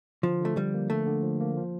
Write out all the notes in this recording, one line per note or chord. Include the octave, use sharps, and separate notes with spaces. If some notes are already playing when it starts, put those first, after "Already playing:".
D3 F3
D3 A3
F3 G3
A#3
D3 A3
D3
F3
A#3
F3